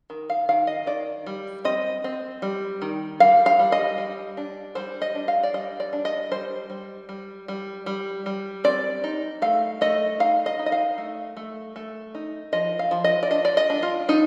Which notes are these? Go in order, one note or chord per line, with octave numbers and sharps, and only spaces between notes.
D#3
F5
D#3 F5
D#5
D#3 D5
G3
C4 D#5
C4
G3
D#3
G3 F5
F5
G3
D#5
G3
D4
G3 C5
D#5
D4
F5
D5
G3 D#5
D5
D4
D#5
G3 C5
G3
G3
G3
G3
G3
C4 D5
D#4
A3 F5
A3 D#5
D#4 F5
D#5
D#4
D#5
F5
A3
A3
A3
D#4
F3 D#5
F5
F3
D#5
D5
D4 D#5
D5
D#5
D4
F4
D4 D#4